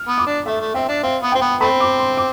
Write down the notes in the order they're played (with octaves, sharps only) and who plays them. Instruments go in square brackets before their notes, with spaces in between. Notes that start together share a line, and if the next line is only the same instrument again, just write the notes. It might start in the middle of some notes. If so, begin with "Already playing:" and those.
Already playing: [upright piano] F6
[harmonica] B3
[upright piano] D6
[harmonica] D4
[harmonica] A3 [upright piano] E5
[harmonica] A3
[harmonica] C4 [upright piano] E5
[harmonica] D4
[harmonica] C4 [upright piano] F5
[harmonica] B3
[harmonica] C4 [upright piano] G5
[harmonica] B3
[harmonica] A3 C4 [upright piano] B5
[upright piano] D6
C6
D6